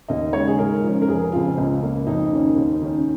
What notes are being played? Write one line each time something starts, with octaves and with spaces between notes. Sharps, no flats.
D#2 D#5
C#3 G#3 C#5
G#4
G#2 A#4
F3 C#4
A#4
F1 G#4
F2 C#3 F4
C#2
C#3 A#3 C#4
F2 D#4
D#3 A#3 C#4
D#2
D#3 C#4